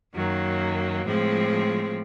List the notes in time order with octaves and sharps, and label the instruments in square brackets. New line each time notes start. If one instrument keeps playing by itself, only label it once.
[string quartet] F#2 D#3 F#3 A#3
A2 F3 G#3 C4